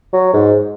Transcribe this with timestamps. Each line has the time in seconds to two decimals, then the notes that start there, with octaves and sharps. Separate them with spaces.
0.13 F#3
0.33 G#2